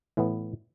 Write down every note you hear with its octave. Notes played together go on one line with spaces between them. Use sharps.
A2 E3 B3